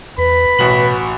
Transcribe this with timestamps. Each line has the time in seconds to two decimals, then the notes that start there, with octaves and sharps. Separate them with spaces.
0.18 E2 B4 B5
0.59 A1 B2 F#4 F#7